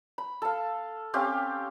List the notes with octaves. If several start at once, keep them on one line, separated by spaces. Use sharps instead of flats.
B5
A4 F5
C4 C#4 G4 F5